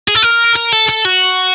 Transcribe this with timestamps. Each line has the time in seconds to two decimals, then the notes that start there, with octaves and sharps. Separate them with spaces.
0.08 G#4
0.15 A4
0.23 A#4
0.56 A#4
0.72 A4
0.89 A4
1.05 F#4